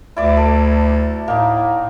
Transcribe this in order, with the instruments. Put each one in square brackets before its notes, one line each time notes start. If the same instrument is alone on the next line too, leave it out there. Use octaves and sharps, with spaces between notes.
[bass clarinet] D2 [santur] E4 D5 D6
[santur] A4
[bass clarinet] A2 [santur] A#3 D#4